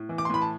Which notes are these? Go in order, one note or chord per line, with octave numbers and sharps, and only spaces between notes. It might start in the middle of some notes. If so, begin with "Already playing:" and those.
Already playing: A2
E3
D6
C6
A2 B5
A5